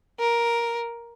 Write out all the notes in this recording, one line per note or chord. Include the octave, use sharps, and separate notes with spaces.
A#4